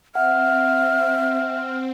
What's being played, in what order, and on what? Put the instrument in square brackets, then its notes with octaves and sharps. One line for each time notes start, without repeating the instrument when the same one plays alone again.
[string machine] C4 [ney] E5 [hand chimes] F#5 [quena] F6